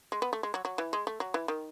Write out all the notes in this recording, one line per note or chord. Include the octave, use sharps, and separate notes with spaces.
G#3
B3
A3
G#3
F#3
F#3
E3
G#3
A3
F#3
E3
D#3